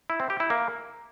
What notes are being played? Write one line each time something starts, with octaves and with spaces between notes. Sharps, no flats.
E4
C4
G4
E4
A#3